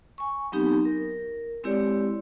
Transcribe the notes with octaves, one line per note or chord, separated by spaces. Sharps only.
G#5 C#6
F#3 B3 C4 D#4 G4
A#4
G#3 C4 E4 G4 C#5 D5